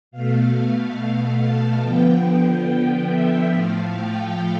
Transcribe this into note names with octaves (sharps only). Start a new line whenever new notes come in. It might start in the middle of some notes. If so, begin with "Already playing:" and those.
B2 A3 F5
A5
D3 F3 B3 G5
G5
E5
A2 F3 A3 F5
G5